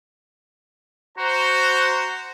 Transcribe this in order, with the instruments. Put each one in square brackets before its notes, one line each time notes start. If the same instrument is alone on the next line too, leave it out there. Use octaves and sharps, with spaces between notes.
[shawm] F#4 [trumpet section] C5 A#5